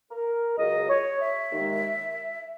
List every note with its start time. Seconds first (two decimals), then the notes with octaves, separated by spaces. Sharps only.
0.11 A#4
0.58 C#2 C#3 F#3 D#5
0.89 C#5
1.20 E5
1.51 D#2 D#3 G#3